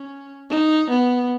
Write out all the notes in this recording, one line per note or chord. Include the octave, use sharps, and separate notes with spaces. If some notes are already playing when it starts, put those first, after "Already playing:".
Already playing: C#4
D#4
B3